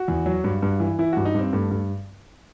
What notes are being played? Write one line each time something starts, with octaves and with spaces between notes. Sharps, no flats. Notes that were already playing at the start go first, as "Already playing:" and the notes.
Already playing: F#4
E2
F#3
G2
G2
E3
E3 E4
G2 F#4
D#4
G2 C4
G2 A3
G2